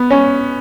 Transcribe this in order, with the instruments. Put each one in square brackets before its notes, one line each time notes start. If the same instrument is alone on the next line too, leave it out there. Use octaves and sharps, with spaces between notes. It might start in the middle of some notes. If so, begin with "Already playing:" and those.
Already playing: [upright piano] B3
C#4